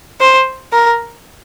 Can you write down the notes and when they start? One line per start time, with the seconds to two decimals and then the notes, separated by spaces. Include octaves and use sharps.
0.21 C5
0.73 A#4